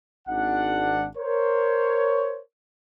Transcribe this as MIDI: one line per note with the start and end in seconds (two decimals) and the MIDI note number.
0.28 1.06 32
0.28 1.06 62
0.28 1.06 78
1.17 2.40 70
1.17 2.40 72
1.17 2.40 73